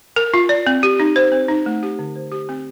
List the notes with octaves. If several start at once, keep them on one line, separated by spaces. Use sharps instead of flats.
A#4
F4
D5
C4
G4
D#4
C5
C4
D#4
A3
G4
D3
C5
G4
C4